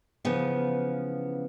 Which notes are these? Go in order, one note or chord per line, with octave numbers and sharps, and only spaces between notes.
C#3 E3 F3 B3